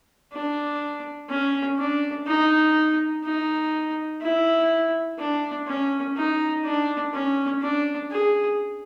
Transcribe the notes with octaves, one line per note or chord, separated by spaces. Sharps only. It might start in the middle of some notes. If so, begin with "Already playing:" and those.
D4
C#4
D4
D#4
D#4
E4
D4
C#4
D#4
D4
C#4
D4
G#4